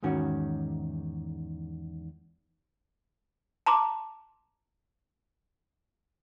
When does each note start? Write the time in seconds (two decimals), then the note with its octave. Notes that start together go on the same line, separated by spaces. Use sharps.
0.03 E2 G#2 D#3 C#4 F#4
3.66 A5 A#5 C6 D6